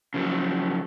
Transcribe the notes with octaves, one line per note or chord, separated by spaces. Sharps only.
C#3 F3 F#3